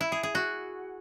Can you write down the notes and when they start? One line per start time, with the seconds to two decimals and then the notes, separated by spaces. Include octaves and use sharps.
0.01 E4
0.12 G#4
0.23 G#4
0.35 F#4